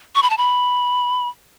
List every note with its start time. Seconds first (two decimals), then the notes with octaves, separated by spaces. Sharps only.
0.15 C#6
0.23 B5
0.30 A5
0.38 B5